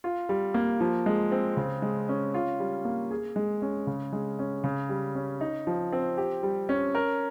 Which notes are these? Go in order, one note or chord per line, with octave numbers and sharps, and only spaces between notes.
F4
G3
A#3
F3
G#3
C4
C#3
G#3
C#4
F4
G3
A#3
G#4
G#3
C#4
C#3
G#3
C#4
C#3
G3
C#4
D#4
F3
C4
G4
G3
C#4
A#4